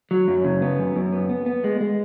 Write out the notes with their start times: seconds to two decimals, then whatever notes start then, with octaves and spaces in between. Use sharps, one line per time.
0.11 F#3
0.28 F#2
0.44 C#3
0.62 B3
0.79 F#2
0.96 F#2
1.13 B3
1.29 B3
1.46 B3
1.64 G#3
1.81 G#3